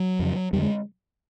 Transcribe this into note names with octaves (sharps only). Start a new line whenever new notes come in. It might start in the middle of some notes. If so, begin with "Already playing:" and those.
Already playing: F#3
F2 C#3
F2 D3 G3
G#3